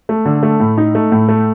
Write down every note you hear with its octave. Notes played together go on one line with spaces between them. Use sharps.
A3
D3
A3
A2
D#4
A3
A2
A3